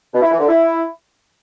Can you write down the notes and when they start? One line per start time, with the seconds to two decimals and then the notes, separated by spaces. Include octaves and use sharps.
0.14 B2
0.22 E4
0.31 E3
0.39 D3
0.48 E4